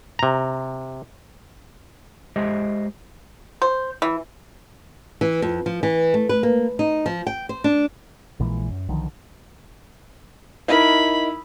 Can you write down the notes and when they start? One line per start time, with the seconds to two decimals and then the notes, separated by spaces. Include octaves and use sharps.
0.19 C3 A#5
2.36 G#3 G4 C5 D#5 E5
3.62 C5
4.02 E3
5.21 E3
5.42 F2
5.66 F3
5.83 E3
6.14 A3
6.29 B4
6.43 A#3
6.79 D#4
7.06 F3
7.27 G5
7.49 C5
7.64 D4
8.39 A#1 A#2 E3 G#3
8.70 F#2
8.88 B1 D3 D#3 F3
10.68 D#4 E4 A#4 B5